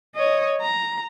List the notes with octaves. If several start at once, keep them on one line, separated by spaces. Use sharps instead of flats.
C#5 D#5
A#5